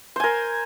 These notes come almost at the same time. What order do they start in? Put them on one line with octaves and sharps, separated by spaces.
C5 G#5 A#4